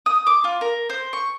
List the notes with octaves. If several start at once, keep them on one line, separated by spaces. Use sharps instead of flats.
D#6
D6
F4
A#4
C5
C#6